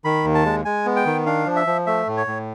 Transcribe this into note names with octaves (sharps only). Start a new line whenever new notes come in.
D#3 B5
D#2
A5
G#3
G#3 G#5
B3
G5
D#3
D4 F5
F3
E5
F3
A3 E5
A2
C#5
A2